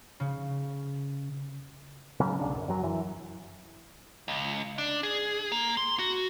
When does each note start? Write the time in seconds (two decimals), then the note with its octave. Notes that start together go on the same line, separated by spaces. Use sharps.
0.20 C#3
2.20 C#3 F#3 C#4
2.39 B1 C#3 D4
2.55 F#2
2.68 F#2 F#3
2.83 F#2 E3
4.28 C#2
4.78 D4
5.03 G#4
5.52 A#3
5.77 C6
5.99 F#4